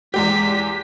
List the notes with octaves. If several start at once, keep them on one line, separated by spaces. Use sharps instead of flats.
E2 G#3 G4 B6